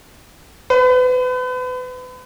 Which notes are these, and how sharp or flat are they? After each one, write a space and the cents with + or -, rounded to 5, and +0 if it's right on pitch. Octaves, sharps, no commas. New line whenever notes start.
B4 +35